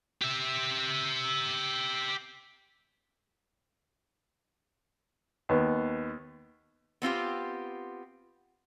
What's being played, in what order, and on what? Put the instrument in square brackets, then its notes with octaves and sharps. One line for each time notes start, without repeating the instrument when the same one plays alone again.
[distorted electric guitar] G4 E5
[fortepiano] D#2 B3
[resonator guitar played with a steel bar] B3 C4 F4 G4